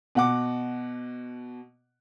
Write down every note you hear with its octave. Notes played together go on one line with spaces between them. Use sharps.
B2 F#5 D6